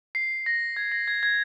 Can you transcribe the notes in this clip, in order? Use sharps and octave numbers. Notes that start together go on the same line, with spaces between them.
C7
A#6
G#6
A#6
G#6
G#6